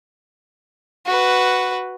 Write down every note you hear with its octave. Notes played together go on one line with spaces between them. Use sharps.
F#4 B4